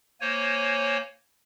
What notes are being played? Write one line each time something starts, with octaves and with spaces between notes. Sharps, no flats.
A#3 C5 C#5 G#5